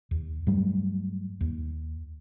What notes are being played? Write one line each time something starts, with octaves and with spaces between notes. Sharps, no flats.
D#2
G2 F#3 G3 A3
D#2